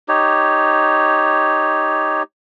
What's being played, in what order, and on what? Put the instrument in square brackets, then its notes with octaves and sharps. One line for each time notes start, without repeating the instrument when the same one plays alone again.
[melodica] D#4 G4 C#5